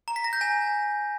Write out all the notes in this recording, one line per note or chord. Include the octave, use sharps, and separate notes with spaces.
A#5
B6
A#6
G6
G#5